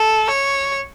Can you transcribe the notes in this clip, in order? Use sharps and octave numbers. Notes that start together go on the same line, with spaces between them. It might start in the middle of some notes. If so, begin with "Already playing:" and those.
Already playing: A4
C#5